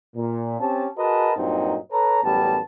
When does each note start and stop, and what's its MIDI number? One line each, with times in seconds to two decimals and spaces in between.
0.16 0.59 46
0.60 0.87 60
0.60 0.87 61
0.60 0.87 67
0.60 0.87 81
0.98 1.32 66
0.98 1.32 68
0.98 1.32 70
0.98 1.32 71
0.98 1.32 75
0.98 1.32 81
1.37 1.77 43
1.37 1.77 46
1.37 1.77 54
1.37 1.77 60
1.37 1.77 63
1.92 2.20 69
1.92 2.20 71
1.92 2.20 73
1.92 2.20 82
2.24 2.60 33
2.24 2.60 42
2.24 2.60 55
2.24 2.60 59
2.24 2.60 81